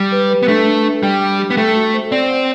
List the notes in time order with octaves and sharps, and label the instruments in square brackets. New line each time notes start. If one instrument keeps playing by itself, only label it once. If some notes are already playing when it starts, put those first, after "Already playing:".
Already playing: [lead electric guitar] G3 [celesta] G4 G5
[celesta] B4
B4
[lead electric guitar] B3
[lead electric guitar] A3 [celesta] D4
[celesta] D4
D4
[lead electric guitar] G3 [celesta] G5
[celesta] G5
G4
[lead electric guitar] B3
[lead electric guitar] A3 [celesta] G5
[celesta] F#4
C5
[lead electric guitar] C4 [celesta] D5
[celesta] F#5